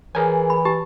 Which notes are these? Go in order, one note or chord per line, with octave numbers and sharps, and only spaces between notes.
E3 G#4 A#4 C#5 G#5
B5
G4 A5